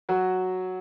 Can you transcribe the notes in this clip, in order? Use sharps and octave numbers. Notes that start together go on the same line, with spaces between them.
F#3 F#4